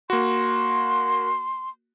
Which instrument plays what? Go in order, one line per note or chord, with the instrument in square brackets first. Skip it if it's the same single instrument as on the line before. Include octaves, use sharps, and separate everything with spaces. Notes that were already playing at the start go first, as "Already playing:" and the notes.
[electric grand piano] A#3 F#4 [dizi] C6